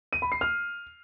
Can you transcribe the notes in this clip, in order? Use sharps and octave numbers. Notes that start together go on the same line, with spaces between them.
D#7
B5
C7
F6